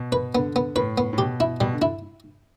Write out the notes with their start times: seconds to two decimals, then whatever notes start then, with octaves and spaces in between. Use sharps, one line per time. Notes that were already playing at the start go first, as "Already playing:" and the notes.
Already playing: B2
0.12 B4
0.35 D3 B3
0.56 B3
0.76 A2 B4
0.98 B3
1.13 A2
1.18 B2 G4
1.40 E4
1.61 B2 G3
1.73 D3
1.82 E4